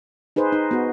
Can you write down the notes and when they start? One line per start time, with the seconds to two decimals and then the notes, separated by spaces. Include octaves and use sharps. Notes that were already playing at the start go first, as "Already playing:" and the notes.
0.36 D#4 G#4 B4 C5
0.52 D#4
0.71 B3 F#4